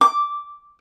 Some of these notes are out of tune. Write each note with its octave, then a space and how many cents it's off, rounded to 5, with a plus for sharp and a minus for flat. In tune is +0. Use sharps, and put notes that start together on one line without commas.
D6 -5